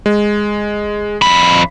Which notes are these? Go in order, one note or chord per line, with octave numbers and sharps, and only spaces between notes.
G#3
F2 B5